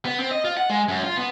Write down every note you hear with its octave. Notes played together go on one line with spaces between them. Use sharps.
B3
C4
D#5
F4
F#5
G#3
F#2
F4
B3